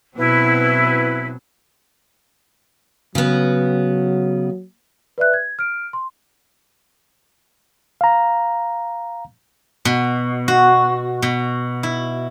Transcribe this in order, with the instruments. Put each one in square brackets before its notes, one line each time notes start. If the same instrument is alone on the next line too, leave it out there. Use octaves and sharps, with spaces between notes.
[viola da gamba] B2 F#3 C4 [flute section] E4 B4
[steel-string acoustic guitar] C#3 B3 [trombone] F#3
[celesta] B4 D5 E5 F#6
G#6
F6 D7
C6
[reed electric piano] F5 A#5
[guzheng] B2
F#4
B2
E4